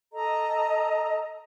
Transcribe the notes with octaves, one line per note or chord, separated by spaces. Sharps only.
A4 D#5 A#5